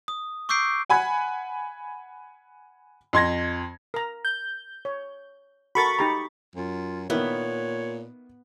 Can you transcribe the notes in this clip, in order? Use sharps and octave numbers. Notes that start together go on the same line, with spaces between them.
D#6
C#6 D6 E6 G6 C7 D7
F#5 G#5 B5 G#6
F2 C6 G#6 A#6
A#4 A#5
G6
C#5
F#4 A4 A#4 B5 C#6 A6
D#4 G4 A#5
F#2 F4
A#2 D#3 A#3 B3 E4 C#5